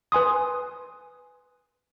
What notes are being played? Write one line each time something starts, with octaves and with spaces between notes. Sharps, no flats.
B4 G#5 C6 D#6